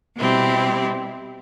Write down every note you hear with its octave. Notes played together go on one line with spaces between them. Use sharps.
B2 G3 C4 E4 G4